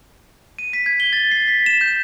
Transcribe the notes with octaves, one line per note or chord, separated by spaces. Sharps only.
D#7
B6
G#6
G7
A6
C7
B6
E7
G6